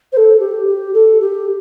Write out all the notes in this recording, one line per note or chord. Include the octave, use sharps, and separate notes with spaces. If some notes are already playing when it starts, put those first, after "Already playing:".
C5
A4
G4
G4
A4
G4